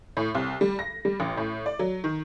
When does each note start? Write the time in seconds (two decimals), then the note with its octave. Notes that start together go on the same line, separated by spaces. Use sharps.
0.17 A2
0.35 C2
0.61 G3
0.79 A#6
1.05 G3
1.20 A1
1.37 A2
1.66 D5
1.79 F#3
2.04 D#3